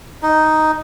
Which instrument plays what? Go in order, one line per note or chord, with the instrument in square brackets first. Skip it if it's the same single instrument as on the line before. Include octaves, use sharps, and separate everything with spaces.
[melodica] D#4